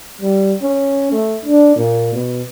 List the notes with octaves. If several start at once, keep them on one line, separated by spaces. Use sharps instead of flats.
G3
C#4
A3
D4
A#2
B2